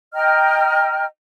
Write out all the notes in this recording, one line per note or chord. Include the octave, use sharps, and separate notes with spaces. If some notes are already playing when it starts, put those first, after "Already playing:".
D#5 G5 A#5 F6